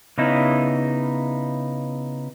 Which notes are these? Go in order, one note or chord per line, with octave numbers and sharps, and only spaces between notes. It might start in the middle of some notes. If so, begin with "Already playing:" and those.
C#3 B3 D#4 E4